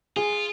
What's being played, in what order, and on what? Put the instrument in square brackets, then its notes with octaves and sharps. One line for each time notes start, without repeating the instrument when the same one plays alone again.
[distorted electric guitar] F4 [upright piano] G#4